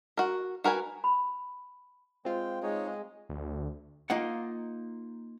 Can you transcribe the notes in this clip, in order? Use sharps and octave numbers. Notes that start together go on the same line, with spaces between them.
F#4 A#4
F#4 A#4 B4 G#5
B5
G#3 C4 F4 G5
G#3 D#4 C#5
D2
A#3 D#4 F4 F#5